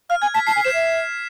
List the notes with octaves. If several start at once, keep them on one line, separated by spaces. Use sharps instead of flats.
F5 F6
G#5 G#6
A5 B6
A5 C7
G#5
C5 E7
E5